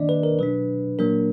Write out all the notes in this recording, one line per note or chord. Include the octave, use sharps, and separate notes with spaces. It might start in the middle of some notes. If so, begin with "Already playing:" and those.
Already playing: D#3 A#3 D4 D5 D#5
B4
A#4
B2 F#3 D4 B4
A#2 F#3 A#3 D4 A#4